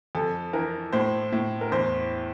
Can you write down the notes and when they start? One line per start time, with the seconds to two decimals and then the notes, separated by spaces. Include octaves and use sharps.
0.15 F2 A4
0.53 E3 A#4
0.93 A2 C5
1.32 A2
1.61 A#4
1.72 E2 C5